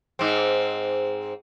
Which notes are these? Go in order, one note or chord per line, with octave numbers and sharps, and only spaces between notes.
G#2 C4